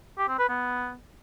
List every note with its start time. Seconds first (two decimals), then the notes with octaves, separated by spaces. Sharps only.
0.18 G4
0.29 C4
0.39 B4
0.49 B3